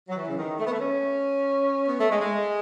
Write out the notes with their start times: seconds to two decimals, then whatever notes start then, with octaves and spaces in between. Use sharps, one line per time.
0.09 F#3
0.15 E3
0.27 C#3
0.36 D#3
0.57 A3
0.65 B3
0.72 A3
0.78 C#4
1.86 B3
1.98 A3
2.09 G#3
2.19 G#3